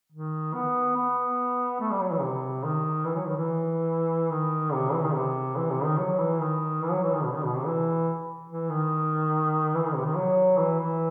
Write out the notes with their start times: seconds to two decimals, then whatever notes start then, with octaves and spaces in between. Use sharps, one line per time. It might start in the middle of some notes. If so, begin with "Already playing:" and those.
0.12 D#3
0.54 B3
0.96 B3
1.80 A3
1.90 G3
2.01 F#3
2.11 E3
2.21 C3
2.64 D#3
3.05 E3
3.15 F#3
3.26 D#3
3.37 E3
4.31 D#3
4.73 C3
4.92 E3
5.04 D#3
5.14 C3
5.56 E3
5.71 C3
5.84 D#3
5.98 F#3
6.19 E3
6.40 D#3
6.82 E3
6.92 F#3
7.03 E3
7.13 D#3
7.24 B2
7.34 D#3
7.44 B2
7.55 C3
7.66 E3
8.50 E3
8.70 D#3
9.75 E3
9.86 D#3
9.95 C3
10.06 D#3
10.16 F#3
10.58 E3
10.80 E3